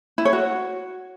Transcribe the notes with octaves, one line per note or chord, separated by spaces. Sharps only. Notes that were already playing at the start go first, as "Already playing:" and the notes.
E4
C#5
F#4